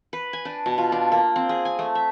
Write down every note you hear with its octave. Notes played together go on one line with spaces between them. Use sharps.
B4
G#5
D4
B2
F4
D4
A#3
C4
G#4
G#5
A3
E5